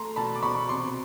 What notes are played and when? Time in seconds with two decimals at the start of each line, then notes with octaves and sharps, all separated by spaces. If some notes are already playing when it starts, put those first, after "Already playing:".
Already playing: A3 A#5 C6
0.16 B2 A5 B5
0.35 D6
0.42 B2 B5 C#6
0.69 C3 C6 D6